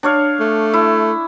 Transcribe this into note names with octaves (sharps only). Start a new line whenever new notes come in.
D4 C#5 F5
A3
E4